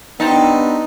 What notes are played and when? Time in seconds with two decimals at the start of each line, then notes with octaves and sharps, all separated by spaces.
0.20 B3 C4 D4 D#4 G4 A5